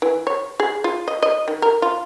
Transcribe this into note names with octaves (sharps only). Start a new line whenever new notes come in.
E3
C#5
G#4
F4
D#5
D#5
D#3
A#4
F4